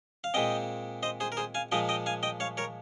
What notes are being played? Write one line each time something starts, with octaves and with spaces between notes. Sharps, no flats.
F5
A#2 G#3 C4 D#5 G5
C5 D#5
G#4 C5
A#4
G#4 C5
F5 G#5
A#2 F3 G#3 D#5 G5
D#5 G5
F5 G#5
D#5 G5
C#5 F5
A#4 C#5